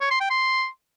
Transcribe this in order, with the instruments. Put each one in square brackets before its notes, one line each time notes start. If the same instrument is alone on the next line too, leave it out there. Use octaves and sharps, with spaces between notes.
[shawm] C#5
C6
G5
C6